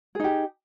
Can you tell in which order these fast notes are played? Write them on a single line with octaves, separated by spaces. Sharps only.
G#4 D#4 G4